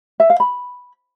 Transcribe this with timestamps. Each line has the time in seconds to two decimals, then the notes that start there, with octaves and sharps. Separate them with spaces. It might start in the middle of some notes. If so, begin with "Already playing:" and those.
0.20 E5
0.30 F5
0.40 B5